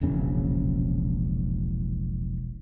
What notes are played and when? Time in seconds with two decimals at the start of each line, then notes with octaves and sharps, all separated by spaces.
0.01 E1 A#1 C#3 C#4